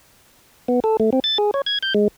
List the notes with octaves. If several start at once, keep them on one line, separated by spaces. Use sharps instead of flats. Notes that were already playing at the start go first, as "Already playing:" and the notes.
B3
A4
A3
C4
A6
G#4
C#5
G#6
G6
G#3